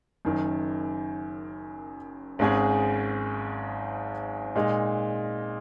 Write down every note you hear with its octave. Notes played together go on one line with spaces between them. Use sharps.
F#1 F#2 D#3
G#1 G#2 G#3 C#4 G#4
A#2 G#3 D#4